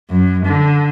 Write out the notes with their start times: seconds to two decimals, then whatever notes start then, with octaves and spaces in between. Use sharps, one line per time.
0.10 F#2
0.45 D3